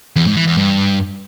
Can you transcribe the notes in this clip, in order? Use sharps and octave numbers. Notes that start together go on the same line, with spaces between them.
E2
G#2
E3
E2
G2